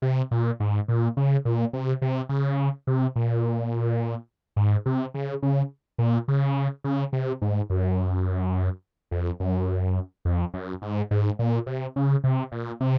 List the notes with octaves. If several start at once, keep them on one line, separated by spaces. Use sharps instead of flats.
C3
A#2
G#2
A#2
C#3
A#2
C3
C3
C#3
C3
A#2
G#2
C3
C#3
C#3
A#2
C#3
C#3
C3
G#2
F#2
F2
F#2
F2
F#2
G#2
G#2
A#2
C3
C#3
C3
A#2
C3